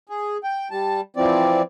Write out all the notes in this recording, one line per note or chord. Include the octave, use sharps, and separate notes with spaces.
G#4
G5
G3 A5
E3 F3 C4 D5